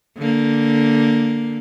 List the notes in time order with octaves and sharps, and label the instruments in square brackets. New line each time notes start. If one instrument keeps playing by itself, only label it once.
[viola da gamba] D3 A#3